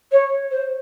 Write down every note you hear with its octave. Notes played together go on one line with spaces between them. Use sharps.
C#5
C5